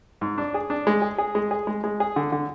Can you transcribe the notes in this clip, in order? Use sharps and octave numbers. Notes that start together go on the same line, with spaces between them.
G#2
D4
G#4
D4
G#3
G#4
G#4
G#3
G#4
G#3
G#3
G#4
D3
D3